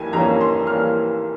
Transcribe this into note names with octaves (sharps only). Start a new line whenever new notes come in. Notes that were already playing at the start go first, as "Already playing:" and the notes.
Already playing: F2 E3 G3 A#3 G#5
F2 E3 G3 A#3 C#4 A#5
C6
E3 G3 A#3 C#4 F6